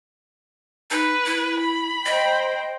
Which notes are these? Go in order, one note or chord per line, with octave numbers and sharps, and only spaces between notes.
D#4 B4
E4
B5
C5 D#5 G5